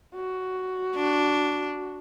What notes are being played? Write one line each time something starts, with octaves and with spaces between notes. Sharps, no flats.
F#4
D4